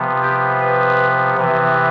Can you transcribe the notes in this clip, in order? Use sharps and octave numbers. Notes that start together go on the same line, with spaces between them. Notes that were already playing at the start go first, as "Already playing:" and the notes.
Already playing: C3 F3 B3
G4
B4
C3 E3 B3